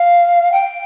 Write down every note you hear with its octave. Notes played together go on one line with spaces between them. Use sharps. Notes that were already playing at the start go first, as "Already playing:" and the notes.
Already playing: F5
G5